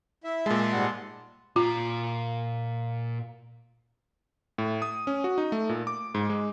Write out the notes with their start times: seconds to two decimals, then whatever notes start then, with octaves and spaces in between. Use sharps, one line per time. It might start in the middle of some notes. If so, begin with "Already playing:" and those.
0.24 E4 E5
0.46 A#2 G#3 A5 C6
0.72 G#2 G3 F#5
1.56 A#2 F4 A#5
4.58 A2
4.82 D#6
5.07 C#4
5.24 F#4
5.38 D#4
5.52 A3
5.69 A#2
5.87 D6
6.15 G#2
6.30 G#3